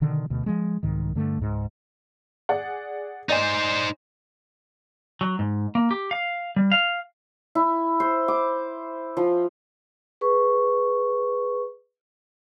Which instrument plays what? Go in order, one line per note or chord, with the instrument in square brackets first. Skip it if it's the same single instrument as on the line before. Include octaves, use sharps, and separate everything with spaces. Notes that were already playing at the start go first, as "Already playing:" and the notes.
[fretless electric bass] B2 D3 D#3
D2 B2
F3 G3 G#3
C2 G#2 D#3
G2 D3 A3
C#2 G#2
[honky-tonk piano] G#4 D5 F#5
[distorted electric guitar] D#4 C5 [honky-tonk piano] D5 D#5 G#5
[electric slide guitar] F#3
G#2
A#3
G4
F5
G3
F5
[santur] E4
C5
D6
F3
[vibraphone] G#4 B4 C#6